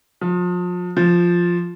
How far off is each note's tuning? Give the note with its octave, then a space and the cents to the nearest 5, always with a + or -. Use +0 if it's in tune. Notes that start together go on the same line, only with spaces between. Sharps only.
F3 +35
F3 +0